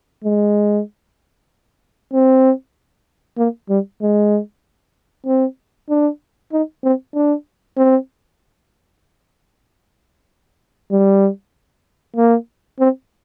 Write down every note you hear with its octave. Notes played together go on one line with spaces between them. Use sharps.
G#3
C4
A#3
G3
G#3
C4
D4
D#4
C4
D4
C4
G3
A#3
C4